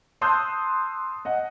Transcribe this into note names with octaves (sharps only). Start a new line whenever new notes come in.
A5 C6 D#6 E6 F#6 G6
D#5 F#5